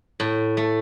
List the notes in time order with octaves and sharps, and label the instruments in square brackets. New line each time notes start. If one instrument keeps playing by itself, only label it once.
[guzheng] A2
A3